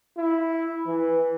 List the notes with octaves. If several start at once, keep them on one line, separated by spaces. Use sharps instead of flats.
E4
E3